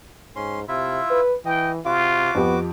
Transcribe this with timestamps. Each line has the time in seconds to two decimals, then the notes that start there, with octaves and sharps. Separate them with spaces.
0.36 G#2 C#4 C6
0.68 C3 E4 F4 E5
1.11 B4
1.45 E3 D#5 G5
1.86 C3 F4 F#4 D6
2.35 F2 B3 G4